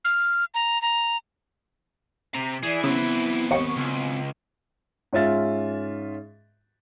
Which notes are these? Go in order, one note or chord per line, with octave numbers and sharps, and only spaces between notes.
F6
A#5
A#5
C3 A#5
E3 G#4 D5
C#3 F#3 B3 C4
G#1 D#2 C#6
C#2
G#2 C#4 F4 E5 A6